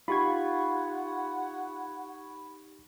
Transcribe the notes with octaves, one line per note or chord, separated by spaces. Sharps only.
D#4 F4 G4 F#5 B5 C#6 G#6